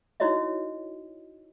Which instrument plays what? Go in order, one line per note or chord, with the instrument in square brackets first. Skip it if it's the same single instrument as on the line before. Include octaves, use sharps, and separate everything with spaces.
[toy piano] D#4 E4 F#4 C#5 D#5 E5